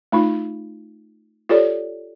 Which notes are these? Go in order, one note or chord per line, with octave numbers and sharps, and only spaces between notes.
A3 D#4 F4
F4 G4 A4 C#5 D5